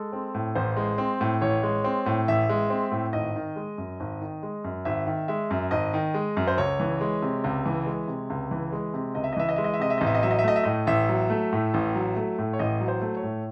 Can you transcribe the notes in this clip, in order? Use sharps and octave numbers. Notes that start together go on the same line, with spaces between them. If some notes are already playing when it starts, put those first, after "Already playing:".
Already playing: G#3 A4
C4
A2
A1 C5
G#3
C4
A2
A1 C#5
G#3
C4
A2
A1 E5
G#3
C4
A2
G#1 D#5
D#3
G#3
F#2
G#1
D#3
G#3
F#2
G#1 E5
D#3
G#3 E5
F#2
G#1 D#5
D#3
G#3
F#2
C5
C#2 C#5
E3
G#3
C3
C#2
E3
G#3
C3
C#2
E3
G#3
C3
C#2 D#5
E5
D#5
E3 E5
D#5
G#3 E5
D#5
E5
C3 D#5
E5
A1 D#5
E5
D#5
F#3 E5
D#5
E5
A3 D#5
E5
A2 D#5
A1 E5
F#3
A3
A2
A1
F#3
A3
A2
C#5
A1 D#5
F#3
C5
A3
C#5
A2